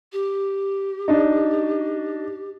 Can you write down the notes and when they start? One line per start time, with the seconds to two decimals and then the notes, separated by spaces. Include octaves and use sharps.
0.12 G4
1.08 D4 D#4